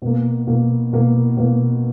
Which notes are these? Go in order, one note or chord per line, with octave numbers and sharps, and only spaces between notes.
B2 A#3
B2 A#3
B2 A#3
B2 A#3